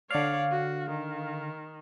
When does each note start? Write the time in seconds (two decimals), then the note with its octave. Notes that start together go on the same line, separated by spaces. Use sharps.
0.10 D3 C#5 D5 F5
0.51 F#4
0.89 D#3